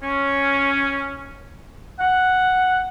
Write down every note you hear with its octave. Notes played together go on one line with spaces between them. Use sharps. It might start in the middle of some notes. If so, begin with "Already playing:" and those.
C#4
F#5